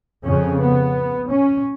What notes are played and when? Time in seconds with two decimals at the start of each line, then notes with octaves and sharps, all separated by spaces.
0.24 F2 C#3 C#4
0.59 B3
1.29 C#4